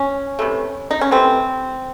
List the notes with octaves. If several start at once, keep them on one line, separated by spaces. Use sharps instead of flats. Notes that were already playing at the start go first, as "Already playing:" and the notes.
Already playing: C#4
C3 E3 A3
D#4
C#4
C3 E3 A3 C4